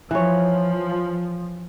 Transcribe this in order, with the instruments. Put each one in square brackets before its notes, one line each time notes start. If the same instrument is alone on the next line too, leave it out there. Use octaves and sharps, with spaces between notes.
[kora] E3 C#5 [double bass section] F3